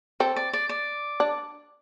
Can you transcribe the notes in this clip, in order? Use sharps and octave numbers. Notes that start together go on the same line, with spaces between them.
C4 A4
D5
D5
D5
D4